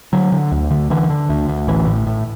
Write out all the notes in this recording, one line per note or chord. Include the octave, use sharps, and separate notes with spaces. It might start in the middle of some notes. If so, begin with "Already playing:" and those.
D3 F#3
D3
D2
D3
D3 E3
D3
D2
D2
A1 E3
A2
A2